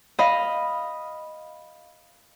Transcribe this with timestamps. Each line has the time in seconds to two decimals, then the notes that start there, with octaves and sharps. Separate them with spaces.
0.19 D#5 F5 B5